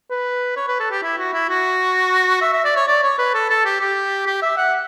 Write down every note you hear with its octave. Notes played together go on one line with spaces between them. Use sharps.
B4
C#5
B4
A4
G4
E4
F#4
E4
F#4
E5
E5
D5
C#5
D5
C#5
B4
A4
A4
G4
G4
G4
E5
F#5